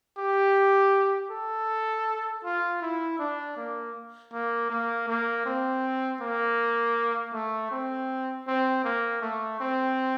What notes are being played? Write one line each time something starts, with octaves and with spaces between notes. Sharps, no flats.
G4
A4
F4
E4
D4
A#3
A#3
A#3
A#3
C4
A#3
A3
C4
C4
A#3
A3
C4